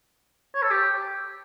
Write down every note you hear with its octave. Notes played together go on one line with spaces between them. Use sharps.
C#5
A4
G4